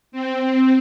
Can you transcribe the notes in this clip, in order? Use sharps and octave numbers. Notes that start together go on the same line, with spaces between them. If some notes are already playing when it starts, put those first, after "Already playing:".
C4